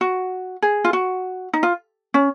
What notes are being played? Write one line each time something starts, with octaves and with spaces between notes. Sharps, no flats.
F#4
G#4
F4
F#4
D#4
F4
C#4